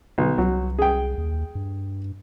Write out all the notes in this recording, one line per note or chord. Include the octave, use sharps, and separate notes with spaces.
B1 D3
C2 F#3
G#4 G5
D#2
G2